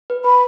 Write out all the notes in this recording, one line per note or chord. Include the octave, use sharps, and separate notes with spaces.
B4
B4 B5